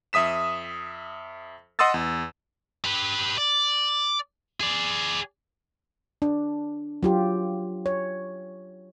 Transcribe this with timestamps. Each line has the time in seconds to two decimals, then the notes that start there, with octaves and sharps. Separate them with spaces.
0.13 F2 E5 D#6 B6 E7
1.79 D#5 F#5 C6 D#6 E6 A6
1.94 E2
2.85 G4 B4
3.38 D5
4.61 G#4 D5
6.22 D4
7.03 F#3 F4 G4
7.86 C#5